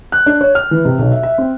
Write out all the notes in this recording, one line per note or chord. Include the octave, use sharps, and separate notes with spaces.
F#6
D4
C#5
F6
E3
C3
B1
E5
E5
C4